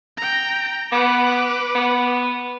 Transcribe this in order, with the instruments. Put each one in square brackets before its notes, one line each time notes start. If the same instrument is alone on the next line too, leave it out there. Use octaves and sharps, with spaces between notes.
[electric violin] G5 A#5
[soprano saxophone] B3 [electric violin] B4 D6
[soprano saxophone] B3